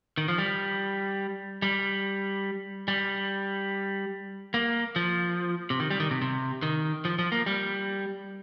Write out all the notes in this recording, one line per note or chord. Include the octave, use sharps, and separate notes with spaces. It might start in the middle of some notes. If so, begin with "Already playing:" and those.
D#3
F3
G3
G3
G3
A#3
F3
C3
D#3
G3
D#3
C3
C3
D#3
F3
F3
A#3
G3